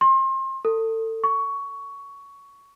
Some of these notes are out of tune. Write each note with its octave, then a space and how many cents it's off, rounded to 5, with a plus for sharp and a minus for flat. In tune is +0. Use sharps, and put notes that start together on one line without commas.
C6 +35
A4 +30
C#6 +15